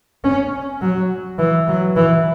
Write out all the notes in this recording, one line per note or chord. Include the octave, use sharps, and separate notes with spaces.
C#4
F#3
E3
F#3
E3